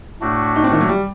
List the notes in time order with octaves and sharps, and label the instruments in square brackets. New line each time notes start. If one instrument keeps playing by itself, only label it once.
[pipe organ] A2 A3 D4 F#4
[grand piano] D#4
C4
D#3
F#3
G3